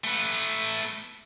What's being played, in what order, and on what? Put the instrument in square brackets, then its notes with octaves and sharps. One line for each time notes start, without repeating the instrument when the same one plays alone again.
[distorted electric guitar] A3 B4